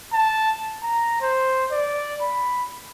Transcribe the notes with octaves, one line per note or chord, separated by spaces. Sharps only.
A5
A#5
C5
D5
B5